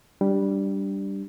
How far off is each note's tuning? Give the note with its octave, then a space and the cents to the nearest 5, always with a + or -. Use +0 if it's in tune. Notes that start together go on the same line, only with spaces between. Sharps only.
G3 -5 D4 -5